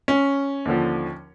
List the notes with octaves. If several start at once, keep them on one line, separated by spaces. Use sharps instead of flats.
C#4
D#2 D3 F3